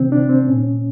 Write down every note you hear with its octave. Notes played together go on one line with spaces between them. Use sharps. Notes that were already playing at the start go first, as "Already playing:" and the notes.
Already playing: C3 D#3 C4
D4
C4
A#2 C#4